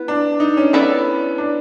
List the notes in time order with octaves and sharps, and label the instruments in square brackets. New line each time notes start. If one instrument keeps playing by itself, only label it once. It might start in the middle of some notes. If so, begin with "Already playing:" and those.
Already playing: [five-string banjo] B3 E4
[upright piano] D4
D#4
C#4
[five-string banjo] B3 E4 A4 D5
[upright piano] D4